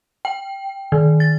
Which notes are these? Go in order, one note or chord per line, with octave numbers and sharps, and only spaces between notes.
G5
D#3
A6